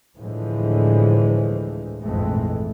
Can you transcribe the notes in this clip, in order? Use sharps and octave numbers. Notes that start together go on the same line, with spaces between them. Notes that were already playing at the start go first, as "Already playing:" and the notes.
D2 A2 D3 E3 F3 G#3
A#1 F2 G#2 E3 G#3 A3